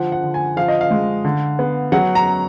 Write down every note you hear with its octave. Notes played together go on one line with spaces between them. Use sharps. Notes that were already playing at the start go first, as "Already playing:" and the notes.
Already playing: D3 F3 F#5
F#5
D3
G#5
F3 F5
D#5
F5
G#3
D3
B3
F#3 F#5
A#5